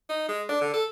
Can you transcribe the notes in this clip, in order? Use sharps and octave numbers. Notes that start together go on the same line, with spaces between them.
D#4
G#3
D4
D3
A4